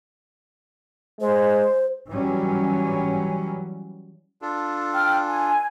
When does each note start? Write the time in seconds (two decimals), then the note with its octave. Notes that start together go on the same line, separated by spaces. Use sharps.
1.21 G#3 C5
2.10 E3 F#3 G3 C#4
4.42 D4 F4 A4
4.94 G5 F6
5.27 G#5